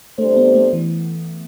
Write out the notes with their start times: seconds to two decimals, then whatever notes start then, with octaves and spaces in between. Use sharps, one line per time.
0.18 C3 G3 A3 D4 A4 C5
0.37 B3
0.55 A3
0.73 E3